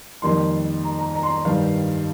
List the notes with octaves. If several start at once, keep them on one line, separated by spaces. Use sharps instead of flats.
F2 D#3 G3 A#3 C6
A#5
A#5
A#5
C6
A#5
G2 D#3 G3 F5